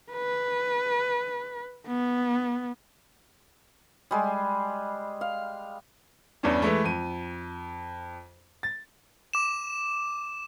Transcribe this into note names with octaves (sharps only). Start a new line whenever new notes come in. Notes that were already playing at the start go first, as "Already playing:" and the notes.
B4
B3
G3 G#3
F5
E2 G2 E3 C#4 D4
E3 G#3 A3
F2 D#7
A6
D6 E7